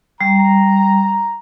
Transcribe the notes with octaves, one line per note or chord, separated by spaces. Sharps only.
G3 A#5